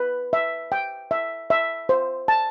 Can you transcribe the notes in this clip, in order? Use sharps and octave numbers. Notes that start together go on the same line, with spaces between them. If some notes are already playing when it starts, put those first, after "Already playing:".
Already playing: B4
E5
G5
E5
E5
C5
A5